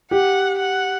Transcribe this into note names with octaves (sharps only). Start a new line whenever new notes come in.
G4 F#5
F#5